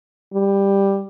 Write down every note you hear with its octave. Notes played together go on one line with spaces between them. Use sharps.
G3